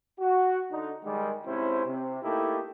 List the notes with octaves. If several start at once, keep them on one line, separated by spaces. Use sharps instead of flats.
F#4
D3 D#4
D#3 G3 G#3
G#2 C3 C#4 E4 C5
C3
A3 A#3 D#4 E4 G4 A4